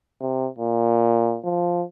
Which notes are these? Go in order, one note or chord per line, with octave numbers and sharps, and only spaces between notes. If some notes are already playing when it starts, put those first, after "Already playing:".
C3
A#2
F3